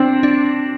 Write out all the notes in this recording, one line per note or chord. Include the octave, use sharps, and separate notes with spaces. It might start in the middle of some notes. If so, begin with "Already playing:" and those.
Already playing: C4 D4
D4